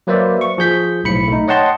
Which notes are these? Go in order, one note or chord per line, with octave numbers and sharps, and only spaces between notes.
F#3 A#3 B4 C5 D5 E5
C#6
F3 G#4 G6 B6
B1 A2 B5 C#7
A3 D#4
C#5 D#5 F#5 G5 A5 C6